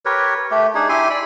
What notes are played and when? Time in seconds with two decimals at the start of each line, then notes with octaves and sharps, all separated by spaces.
0.05 G4 A#4 B4 C#5
0.51 A3 G4
0.75 D4 D#4 G#4
0.89 E4 G4 G#5 C6
1.10 D5 B5